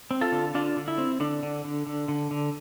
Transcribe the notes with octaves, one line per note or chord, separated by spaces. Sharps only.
C4
F4 A4
D3
D3 D4 F4
D3
E4
C4
D3 D4
D3
D3
D3
D3
D3